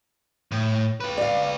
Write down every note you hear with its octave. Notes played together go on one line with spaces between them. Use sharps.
A2
F4 B4
D5 F5